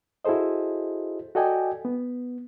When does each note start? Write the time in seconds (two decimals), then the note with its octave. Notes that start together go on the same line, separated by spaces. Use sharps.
0.25 E4 F#4 G#4 A4 C5 D#5
1.35 F#4 A4 D5 D#5 G5 G#5
1.85 B3